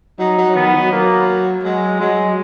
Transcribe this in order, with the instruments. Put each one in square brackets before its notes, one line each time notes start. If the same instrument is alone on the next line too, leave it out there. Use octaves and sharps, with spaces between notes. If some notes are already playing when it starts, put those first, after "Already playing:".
[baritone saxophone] F#3 [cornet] D#4
[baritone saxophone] F#3
[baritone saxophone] D#3 [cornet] B3
[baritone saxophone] F#3
[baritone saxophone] F#3 [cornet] A#3
[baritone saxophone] F#3 [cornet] G#3
[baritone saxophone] F#3 [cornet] G#3